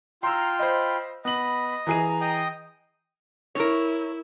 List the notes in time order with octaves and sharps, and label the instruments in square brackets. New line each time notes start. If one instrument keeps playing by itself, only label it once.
[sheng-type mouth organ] F4 G5 [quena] A#5 [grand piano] C6 E6
[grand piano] C5 D#5 [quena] B5
[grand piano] B3 F#7 [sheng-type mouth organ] D#5 [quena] B5
[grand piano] E3 G#4 D#7 [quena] A#5
[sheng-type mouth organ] D#5 G5 D#6
[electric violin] E4 [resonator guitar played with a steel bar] A#4 C#5